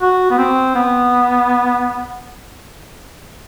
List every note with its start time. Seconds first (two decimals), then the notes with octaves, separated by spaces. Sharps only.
0.02 F#4
0.30 B3
0.38 C4
0.75 B3